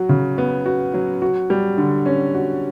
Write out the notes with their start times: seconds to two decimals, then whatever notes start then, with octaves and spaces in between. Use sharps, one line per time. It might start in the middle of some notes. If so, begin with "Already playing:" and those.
Already playing: F#3 F#4
0.09 C#3
0.38 B3
0.66 F#4
0.94 F#3
1.22 F#4
1.50 G3
1.78 D3
2.06 C#4
2.34 F#4